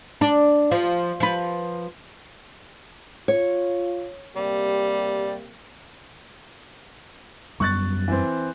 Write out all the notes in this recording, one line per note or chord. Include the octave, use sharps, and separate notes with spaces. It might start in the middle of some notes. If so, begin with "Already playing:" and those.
D4
F3
F3 B4
F4 C#5
C3 G3 A#3 G4
F#2 G3 B3 C#6 F#6 A6
E3 C4